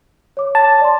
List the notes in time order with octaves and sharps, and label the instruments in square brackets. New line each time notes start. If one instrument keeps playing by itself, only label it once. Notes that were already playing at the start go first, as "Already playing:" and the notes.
[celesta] C#5 D6
[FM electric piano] A5
[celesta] D5 C6